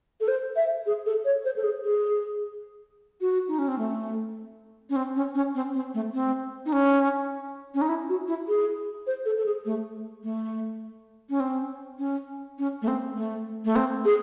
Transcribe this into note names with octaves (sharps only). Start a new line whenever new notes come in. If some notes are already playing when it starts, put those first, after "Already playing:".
A4
C5
E5
G#4
A4
C#5
C5
A4
G#4
G#4
F#4
D#4
C#4
C4
A3
C#4
C4
C#4
C#4
C4
C4
A3
C4
D#4
C#4
C#4
D#4
E4
F#4
E4
G#4
C5
A4
A4
G#4
A3
A3
C#4
C4
C#4
C#4
A3
C4
A3
A3
C4
G#4